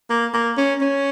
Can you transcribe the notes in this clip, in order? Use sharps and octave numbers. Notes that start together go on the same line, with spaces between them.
A#3
A#3
C#4
C#4